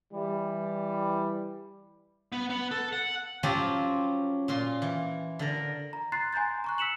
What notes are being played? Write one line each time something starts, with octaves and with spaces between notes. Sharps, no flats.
E3 G3
B3
B3
A4
F#5
F3 F#3 C4 C#4 F4 G4
A#2 F4 C6
E3
D3 A#4
A#5
A#5 C6 F#6 A6 C7
G#5 A#5 C6 G6 A6
A#5 C#6 F#6
E6 B6 C#7 E7 F#7